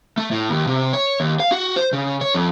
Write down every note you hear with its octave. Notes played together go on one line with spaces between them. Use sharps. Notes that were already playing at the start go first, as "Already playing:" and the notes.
A3
A2
D#2
C3
C#5
D#2
F5
F#4
C5
C#3
C#5
F2